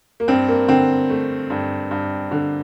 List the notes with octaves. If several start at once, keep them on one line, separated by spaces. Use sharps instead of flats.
A#3
G2 C4
A#3
D3 C4
A3
G2
G2
D3